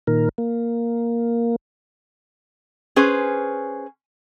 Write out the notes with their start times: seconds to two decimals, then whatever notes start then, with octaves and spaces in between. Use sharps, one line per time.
0.07 A#2 D#3 A#4
0.38 A#3
2.96 C#4 G#4 B4 C5